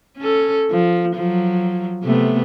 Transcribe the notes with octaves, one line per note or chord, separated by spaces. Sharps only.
C#4 A4
F3
F3 F#3
C3 A3 B3